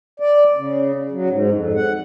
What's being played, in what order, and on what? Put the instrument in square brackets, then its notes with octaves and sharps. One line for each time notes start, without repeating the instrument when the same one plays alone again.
[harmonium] D5
C#3
F#3
G#2
F2
F#5